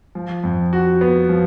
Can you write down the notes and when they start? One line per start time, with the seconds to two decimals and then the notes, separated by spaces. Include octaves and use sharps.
0.15 F3
0.43 F2
0.73 F#4
1.01 B3
1.29 F3